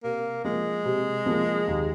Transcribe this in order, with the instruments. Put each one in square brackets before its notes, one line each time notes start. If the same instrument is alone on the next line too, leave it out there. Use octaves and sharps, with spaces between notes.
[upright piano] C3 [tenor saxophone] A#3
[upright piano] F3 A#3 [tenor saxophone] G#3
[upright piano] C3
F3 A#3
D#2